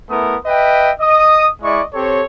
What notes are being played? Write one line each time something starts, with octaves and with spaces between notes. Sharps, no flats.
A3 B3 E4 A#4 D#6
B4 D#5 E5 G5
D#5 D#6
G#3 E4 D5 D#5 C#6
C4 G4 A4 C#5